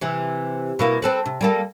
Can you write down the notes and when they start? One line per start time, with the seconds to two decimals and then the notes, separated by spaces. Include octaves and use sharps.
0.01 C3 E3
0.79 B2 A#3 E4
1.02 C4 A4 B4
1.26 C3
1.41 G3 A#3 A4